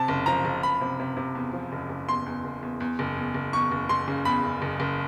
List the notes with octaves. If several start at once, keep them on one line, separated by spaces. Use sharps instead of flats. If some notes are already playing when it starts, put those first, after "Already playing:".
Already playing: C3 A5
F#1
F3 A#5
F#1
F#1 B5
C3
C3
C3
E2
F3
F#1
F#1
E2 C6
E2
F#1
E2
E2
F#1
E2
F#1
E2 C#6
F#1
F#1 C6
C#3
E2 B5
F#1
F#1
F#1